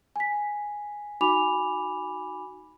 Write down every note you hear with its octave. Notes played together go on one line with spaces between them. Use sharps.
G#5 B6
D#4 F#4 G#5 B5 D6 F7